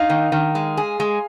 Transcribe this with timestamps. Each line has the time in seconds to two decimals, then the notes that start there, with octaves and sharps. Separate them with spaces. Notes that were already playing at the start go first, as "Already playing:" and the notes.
Already playing: D#4 F5
0.09 D#3
0.32 D#3
0.55 G#3
0.77 G#4
1.00 G#3